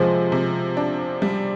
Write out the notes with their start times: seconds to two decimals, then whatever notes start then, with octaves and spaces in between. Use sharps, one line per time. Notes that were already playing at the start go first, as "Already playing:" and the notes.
Already playing: C3 F3 G#3
0.32 C3
0.77 D4
1.22 G3